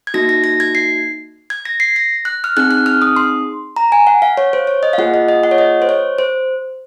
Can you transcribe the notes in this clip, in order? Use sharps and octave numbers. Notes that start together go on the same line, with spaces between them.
G#6
A#3 D#4 F#4 A#6
A#6
A#6
G#6
C7
G#6
A#6
C7
A#6
F#6
F6
C4 D#4 G#4 F#6
F#6
F6
D#6
C6
A#5
G#5
F#5
F5
C#5
C5
C#5
D#5
F5
A#3 F4 G#4 F#5
D#5
D#5
F#5
C#5
D#5
C5
C#5
C5